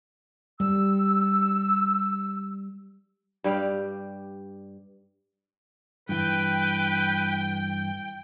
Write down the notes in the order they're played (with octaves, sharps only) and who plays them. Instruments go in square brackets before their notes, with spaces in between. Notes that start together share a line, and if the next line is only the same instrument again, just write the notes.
[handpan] G3 [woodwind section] E6
[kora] G2 G3 G4 F5
[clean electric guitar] G2 E3 [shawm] B4 [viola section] G5